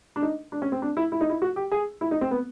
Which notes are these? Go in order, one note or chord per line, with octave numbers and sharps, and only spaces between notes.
D4
D#4
D4
C#4
C4
D4
E4
E4
D#4
E4
F#4
G4
G#4
E4
D#4
C4
B3